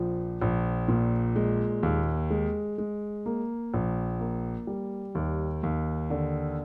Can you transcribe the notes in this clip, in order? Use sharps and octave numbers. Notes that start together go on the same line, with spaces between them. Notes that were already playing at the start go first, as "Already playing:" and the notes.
Already playing: A#1 F3
A#1
A#2
G#3
D#2
G#3
G#3
A#3
A#1
A#3
G3
D#2
D#2
D3